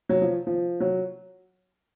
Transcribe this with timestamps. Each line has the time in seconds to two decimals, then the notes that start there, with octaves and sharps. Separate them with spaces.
0.09 F#3
0.22 F3
0.47 F3
0.80 F#3